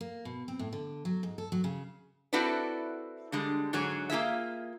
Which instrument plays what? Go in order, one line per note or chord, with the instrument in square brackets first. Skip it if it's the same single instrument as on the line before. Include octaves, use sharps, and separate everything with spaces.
[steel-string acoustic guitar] A#3
B2
C4
A2
D3
F#3
G#2
A4
F#3
C#3
[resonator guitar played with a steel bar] C4 E4 F#4 A4 B4 D5
D3 G3 G#3
G#2 D3 F#3 G#4 C#5
A#3 F4 G#4 E5